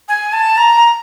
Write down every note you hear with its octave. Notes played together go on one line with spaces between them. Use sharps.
G#5
A5
A#5